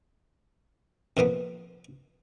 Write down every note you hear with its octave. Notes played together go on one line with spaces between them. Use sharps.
F2 A#2 A#3 B3